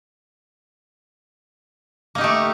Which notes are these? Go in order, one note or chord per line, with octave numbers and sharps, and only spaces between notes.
A3 A#3 D#4 G4